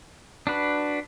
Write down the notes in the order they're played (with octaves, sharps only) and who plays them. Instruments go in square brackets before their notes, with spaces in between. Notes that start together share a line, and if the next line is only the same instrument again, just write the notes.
[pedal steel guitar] D4 F#4 B4